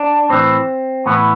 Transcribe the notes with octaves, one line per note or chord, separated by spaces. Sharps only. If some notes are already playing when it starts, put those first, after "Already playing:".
Already playing: D4
A2 E3 C4
A2 E3 B3